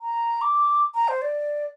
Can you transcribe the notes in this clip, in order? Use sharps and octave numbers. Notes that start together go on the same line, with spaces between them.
A#5
D6
A#5
C5
D5